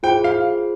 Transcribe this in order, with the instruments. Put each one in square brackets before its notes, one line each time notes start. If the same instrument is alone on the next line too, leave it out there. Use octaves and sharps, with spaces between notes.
[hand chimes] F4 G#4 C5 [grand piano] G5
[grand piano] F5